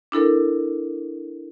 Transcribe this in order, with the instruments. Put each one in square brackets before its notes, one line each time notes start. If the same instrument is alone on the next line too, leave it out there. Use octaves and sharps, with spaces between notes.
[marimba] D4 E4 A4 A#4